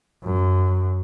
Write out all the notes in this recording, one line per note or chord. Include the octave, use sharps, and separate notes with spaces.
F#2